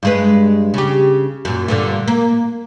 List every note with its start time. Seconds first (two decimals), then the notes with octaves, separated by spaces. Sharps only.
0.03 G2 G#3 B4
0.74 C#3 G4
1.45 F#2 A#2
1.68 G2 A#2 D3
2.08 A#3